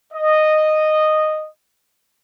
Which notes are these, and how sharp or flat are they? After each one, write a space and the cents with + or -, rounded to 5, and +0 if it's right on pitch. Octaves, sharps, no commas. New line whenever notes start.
D#5 -10